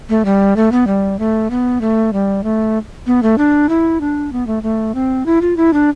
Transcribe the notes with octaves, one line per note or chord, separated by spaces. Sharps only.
A3
G3
A3
B3
G3
A3
B3
A3
G3
A3
B3
A3
D4
E4
D4
B3
A3
A3
C4
E4
F4
E4
D4